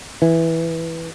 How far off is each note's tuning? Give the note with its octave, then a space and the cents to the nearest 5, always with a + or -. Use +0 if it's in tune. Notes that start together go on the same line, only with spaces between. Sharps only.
E3 -5